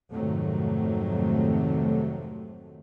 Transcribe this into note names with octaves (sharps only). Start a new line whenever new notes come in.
F2 G#2 C3 D#3 F#3 A3